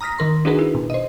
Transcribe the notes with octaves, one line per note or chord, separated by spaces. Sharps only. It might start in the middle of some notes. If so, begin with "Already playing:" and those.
A#5 D#6 F6 A#6 B6
D#3 A#4 C6
D4 D#4 F#4 G#4 A#4 B4
E4
B2
C5 D#5